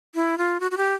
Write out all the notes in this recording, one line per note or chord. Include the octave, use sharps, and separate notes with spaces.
E4
F4
F#4
F#4
G4